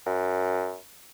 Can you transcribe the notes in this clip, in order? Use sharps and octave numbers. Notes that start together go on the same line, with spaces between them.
F#2